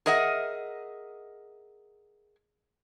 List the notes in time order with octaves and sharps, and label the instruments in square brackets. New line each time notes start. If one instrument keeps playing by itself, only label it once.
[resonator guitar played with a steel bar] G#4 A#4 D#5 E5 F#5